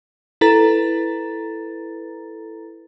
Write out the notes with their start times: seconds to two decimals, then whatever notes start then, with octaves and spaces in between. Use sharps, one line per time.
0.41 E4 A4 B4 A#5 A6